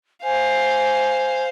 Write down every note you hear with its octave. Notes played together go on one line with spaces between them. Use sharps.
C5 F5 G#5